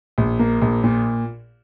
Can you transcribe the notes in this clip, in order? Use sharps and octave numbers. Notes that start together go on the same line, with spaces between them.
A#1
A#3
A#1
A#2